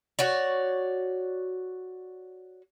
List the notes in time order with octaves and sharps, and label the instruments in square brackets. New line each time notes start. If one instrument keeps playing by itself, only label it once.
[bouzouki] F#4 C#5 D5